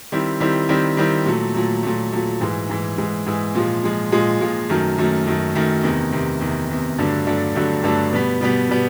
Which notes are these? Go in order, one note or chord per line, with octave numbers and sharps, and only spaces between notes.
D#3 G3 C4 E4
D#3 G3 C4 E4
D#3 G3 C4 E4
D#3 G3 C4 E4
A#2 F#3 A3
A#2 F#3 A3
A#2 F#3 A3
A#2 F#3 A3
G#2 E3 G#3
G#2 E3 G#3
G#2 E3 G#3
G#2 E3 G#3
A#2 F3 G#3
A#2 F3 G#3
A#2 F3 G#3
A#2 F3 G#3
F#2 D#3 F#3 A3
F#2 D#3 F#3 A3
F#2 D#3 F#3 A3
F#2 D#3 F#3 A3
E2 C3 D#3
E2 C3 D#3
E2 C3 D#3
E2 C3 D#3
G2 D3 F#3 A3 D4
G2 D3 F#3 A3 D4
G2 D3 F#3 A3 D4
G2 D3 F#3 A3 D4
B2 G3 B3
B2 G3 B3
B2 G3 B3